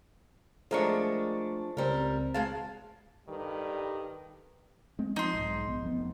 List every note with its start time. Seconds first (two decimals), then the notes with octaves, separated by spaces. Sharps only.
0.71 F3 G#3 A3 D4 A#4 C#6
1.77 C#2 G3 C4 A#4
2.34 B2 G#3 F5 A5
3.28 G2 D#3 G3 G4 A4 B4
4.99 G#3 C4
5.16 F3 D#4 C6
5.34 B1 G#2
5.68 A#1 B3
5.82 F1 F2 B3